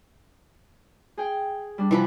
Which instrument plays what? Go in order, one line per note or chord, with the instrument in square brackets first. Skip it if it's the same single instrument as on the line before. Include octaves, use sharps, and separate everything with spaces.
[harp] G#4 G5
G3 D4
[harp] C3 B4 [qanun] E3 F3 B5